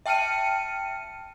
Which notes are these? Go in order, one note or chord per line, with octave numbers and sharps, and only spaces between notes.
E5 G5 A5 F6 C#7 D#7